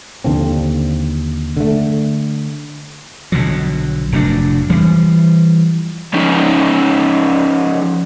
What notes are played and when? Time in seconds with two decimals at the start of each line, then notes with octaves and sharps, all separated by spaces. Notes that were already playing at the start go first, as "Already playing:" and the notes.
0.24 D#2 D3 F3 C4
1.57 D3 A3
3.32 B1 D3 F3 F#3
4.12 F1 A2 F#3 D4
4.70 E3 F3 G3
6.14 F3 C#4 D#4